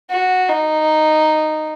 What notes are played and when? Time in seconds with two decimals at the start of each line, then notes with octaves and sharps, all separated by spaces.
0.10 F#4
0.49 D#4